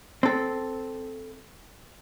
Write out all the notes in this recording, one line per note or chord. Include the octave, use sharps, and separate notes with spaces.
C4 A4